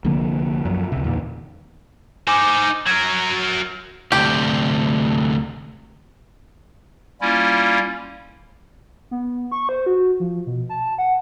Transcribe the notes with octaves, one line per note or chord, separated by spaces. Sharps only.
C2 D3 F3 A#3
F#2 F3
C#2 C3
E2 A#2 D#3
D#4 C5 G#5 D6
F#3 A#4 G#6
D2 C3 G4
G3 A#3 C#4 E4 F4
B3
C#6
C5
F#4
F3
B2
A5
F#5